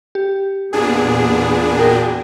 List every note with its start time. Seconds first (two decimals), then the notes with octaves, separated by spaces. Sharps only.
0.15 G4
0.73 E2 A#2 B3 D4 G#4
1.79 F#4 A#4 G5